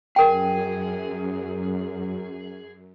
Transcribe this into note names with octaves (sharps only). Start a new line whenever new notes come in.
F#2 G#4 A#4 G5